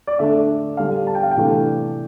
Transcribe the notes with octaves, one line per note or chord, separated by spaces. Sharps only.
D5
D3 A3 D4 E5
D3 G3 D4 F5
A5
G5
F5
G5
C3 E3 A3 D4